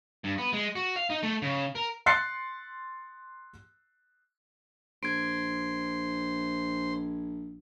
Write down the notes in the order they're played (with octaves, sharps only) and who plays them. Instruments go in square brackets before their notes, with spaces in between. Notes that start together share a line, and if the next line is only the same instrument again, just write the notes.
[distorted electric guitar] G2
B3
G#3
F#4
F5
D#4
A3
C#3
A#4
[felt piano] C6 F#6 A6 C7 C#7
[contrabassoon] A#1 [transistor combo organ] C5 C6 [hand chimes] G#6 D7